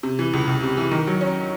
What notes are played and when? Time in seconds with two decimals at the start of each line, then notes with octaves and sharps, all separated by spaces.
0.03 C3
0.19 E3
0.33 C#2
0.47 C#2
0.63 C3
0.77 E3
0.91 D#3
1.07 F#3
1.21 C#4